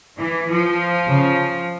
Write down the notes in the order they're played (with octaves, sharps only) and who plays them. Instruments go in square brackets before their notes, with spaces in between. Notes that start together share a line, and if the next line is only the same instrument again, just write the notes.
[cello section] E3
F3
[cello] C#3